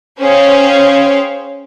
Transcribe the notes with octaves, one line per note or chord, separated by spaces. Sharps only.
C#4 G#4 C5 C#5 F5 G5